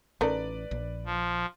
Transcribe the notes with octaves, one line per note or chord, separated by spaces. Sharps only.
A1 A3 C#4 D#4 A#4 B4 D5
A#1
F3